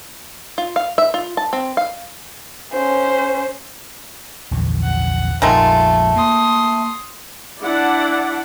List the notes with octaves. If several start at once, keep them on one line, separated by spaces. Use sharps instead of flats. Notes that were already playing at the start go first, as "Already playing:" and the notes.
F4
F5
E5
F4
A5
C4
F5
C#4 C5
A#1 E2 D3
F#5
A#1 F2 D#3 G#3 A3 F4
A#3 C6 D#6
D4 E4 D5 F#5